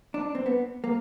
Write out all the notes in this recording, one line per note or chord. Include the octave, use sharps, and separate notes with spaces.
D4
C4
B3
A#3